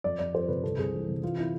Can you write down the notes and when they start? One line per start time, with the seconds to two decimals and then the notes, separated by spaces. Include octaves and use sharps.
0.04 F2 D5
0.19 F2 D5
0.34 F3 C5
0.48 C3 B4
0.64 C2 A4
0.78 C2 G#4
0.93 E3
1.08 C3
1.23 E3 F4
1.38 E4